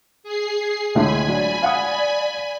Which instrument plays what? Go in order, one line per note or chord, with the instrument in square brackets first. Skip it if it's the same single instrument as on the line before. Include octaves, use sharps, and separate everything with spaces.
[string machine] G#4 C7
[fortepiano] C#2 A2 D3 [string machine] G#5 B5
[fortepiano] F#3 [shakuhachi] D5
[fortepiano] F5 F#5 D#6